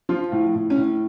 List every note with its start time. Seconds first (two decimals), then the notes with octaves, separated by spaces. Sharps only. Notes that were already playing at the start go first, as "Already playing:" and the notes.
0.09 F3 F4
0.32 A2
0.55 A2
0.70 C#4
0.78 A2